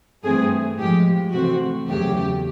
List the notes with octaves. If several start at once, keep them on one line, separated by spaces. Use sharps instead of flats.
G2 E3 A3 C4 G#4
A2 F3 G#3 G4
C3 E3 A3 C4 F#4
E2 C#3 F#3 A3 G4